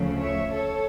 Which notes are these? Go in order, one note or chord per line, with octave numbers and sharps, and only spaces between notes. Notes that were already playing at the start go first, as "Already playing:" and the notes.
Already playing: D2 C#3 F3 A3
C#5 E5
A4 C#5